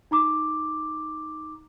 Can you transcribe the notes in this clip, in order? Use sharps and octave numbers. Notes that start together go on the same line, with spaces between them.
D#4 A#5 D6